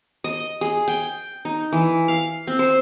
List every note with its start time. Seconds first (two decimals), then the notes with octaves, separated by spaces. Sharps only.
0.24 D#5
0.61 G#4
0.88 G5
1.45 D#4
1.72 E3
2.08 F5
2.47 C4
2.59 C5